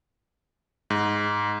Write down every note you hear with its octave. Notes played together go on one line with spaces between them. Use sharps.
G#2